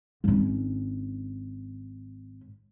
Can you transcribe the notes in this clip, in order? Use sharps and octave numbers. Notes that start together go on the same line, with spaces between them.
G#1 C#4